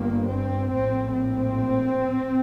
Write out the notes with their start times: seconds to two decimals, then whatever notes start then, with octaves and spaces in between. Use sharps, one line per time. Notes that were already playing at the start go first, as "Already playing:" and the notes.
Already playing: G1 G2 A#3
0.33 C4
0.73 A#1 A2 C4
1.14 C4